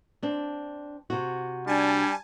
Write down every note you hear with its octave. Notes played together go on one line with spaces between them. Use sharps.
C4 D4
C3 F#4
G3 D4 G#5 A5